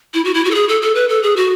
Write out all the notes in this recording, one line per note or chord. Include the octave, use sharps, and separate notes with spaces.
E4
F#4
E4
F#4
A4
G#4
A4
A4
B4
A4
G#4
F#4